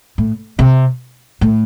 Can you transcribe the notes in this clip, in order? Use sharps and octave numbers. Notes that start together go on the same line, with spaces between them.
A2
C3
A2